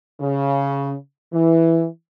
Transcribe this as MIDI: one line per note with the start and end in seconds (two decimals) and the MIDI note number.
0.21 0.93 49
1.33 1.85 52